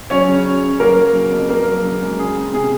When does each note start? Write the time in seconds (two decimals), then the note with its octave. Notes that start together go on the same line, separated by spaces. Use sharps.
0.10 F#3 C#4 C#5
0.28 C#3
0.46 C#4
0.63 C#4
0.80 F#3 A#3 A#4
0.97 F#3
1.15 C#3
1.32 F2
1.49 A#3 A#4
1.68 F#3
1.84 C#3
2.02 G#3
2.19 C#3 G#4
2.36 C4
2.53 C3 G#4